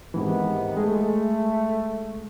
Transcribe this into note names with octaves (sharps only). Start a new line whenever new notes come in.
G#2 C3 D#3 E3 B3
G#3 A3